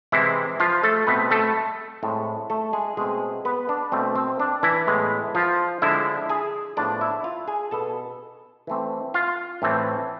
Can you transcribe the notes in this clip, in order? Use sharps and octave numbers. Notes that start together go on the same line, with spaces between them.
C3 E3 G#3 C4 E4
F3 F4
A3 A4
B2 A3 B3 C4 B4
A3 A4
A2 G#3 C4
A3 A4
G#3 G#4
B2 G#3 A3 C4 G#4
B3 B4
D4
B2 A3 C4
C4
D4
E3 E4
A2 G#3 B3
F3 F4
D3 F3 G#3 E4 E5
G#4 G#5
A2 F3 B3 D4 D5
E4 E5
F4 F5
G#4 G#5
B2 B3 A4 A5
E3 A3 C4
F4 F5
A2 E3 A3 C4